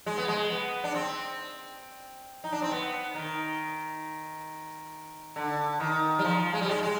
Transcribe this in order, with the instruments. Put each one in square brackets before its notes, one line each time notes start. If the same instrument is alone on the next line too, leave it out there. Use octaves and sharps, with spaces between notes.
[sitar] G#3
B3
G#3
B3
D4
C4
D#4
D4
C4
B3
D#3
D3
D#3
G3
F3
G#3
G3
G#3
G#3